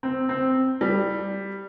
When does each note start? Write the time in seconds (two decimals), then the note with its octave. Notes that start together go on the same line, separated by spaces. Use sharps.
0.03 C4
0.29 C4
0.81 G3